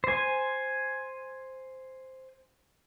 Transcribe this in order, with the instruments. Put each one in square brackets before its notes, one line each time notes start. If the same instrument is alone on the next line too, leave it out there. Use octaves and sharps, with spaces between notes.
[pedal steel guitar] C5 G#5